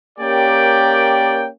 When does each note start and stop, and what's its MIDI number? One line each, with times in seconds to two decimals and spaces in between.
0.19 1.47 58
0.19 1.47 61
0.19 1.47 67
0.19 1.47 70
0.19 1.47 74
0.19 1.47 79